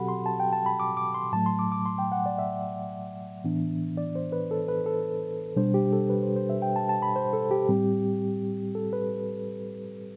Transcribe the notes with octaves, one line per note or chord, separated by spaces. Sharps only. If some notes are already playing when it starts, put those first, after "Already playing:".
Already playing: B2 F#3 C4 F#4 G4 A4 F#5 B5
C6
A5
G5
A5
B5
D6
D6
C6
A2 F#3 A3 A5
C6
D6
D6
C6
G5
F#5
D5
E5
A2 E3 B3 D4
D5
C5
B4
A4
B4
A4
B2 G3 D4 C5
G4
A4
B4
C5
C5
E5
G5
A5
A5
B5
C5
A4
G4
A2 G3 C4
A4
B4